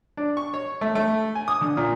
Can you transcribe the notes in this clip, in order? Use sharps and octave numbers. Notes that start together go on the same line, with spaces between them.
D4
C#6
C#5
A3
A3
G#5
D#6
D3
A#2